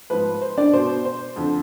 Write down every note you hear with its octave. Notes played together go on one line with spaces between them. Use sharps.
G#2 F3 B4
C5
D4 D5
B2 C5
C5
F2 D3 F3